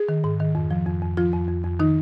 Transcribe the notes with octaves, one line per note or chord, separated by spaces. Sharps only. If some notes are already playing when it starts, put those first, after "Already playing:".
Already playing: G#4
D#3
G#2
D#3
F2
F3
F2
F2
F3 F4
F2
F2
F2
D#3 D#4